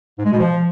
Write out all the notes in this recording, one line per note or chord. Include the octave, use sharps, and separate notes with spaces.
G#2
G#3
B2
F3